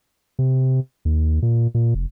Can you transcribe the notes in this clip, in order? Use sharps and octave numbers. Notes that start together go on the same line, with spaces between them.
C3
D#2
A#2
A#2
F1